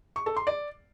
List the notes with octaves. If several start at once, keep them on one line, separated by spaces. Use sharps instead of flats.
C#6
A4
C6
D5